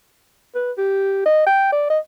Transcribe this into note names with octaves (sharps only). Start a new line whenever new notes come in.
B4
G4
D#5
G5
D5
D#5